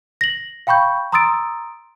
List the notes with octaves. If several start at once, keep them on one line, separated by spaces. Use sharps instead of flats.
A#6 F#7
F5 G5 B5 C#6 G6
A#5 C6 D#6 E6 A6 D7